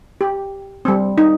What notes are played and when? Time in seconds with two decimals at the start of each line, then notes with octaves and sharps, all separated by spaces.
0.21 G4
0.85 G3 C4
1.18 D#4